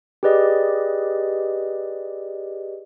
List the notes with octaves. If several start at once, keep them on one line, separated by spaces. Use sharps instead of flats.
G4 G#4 B4 D5 D#5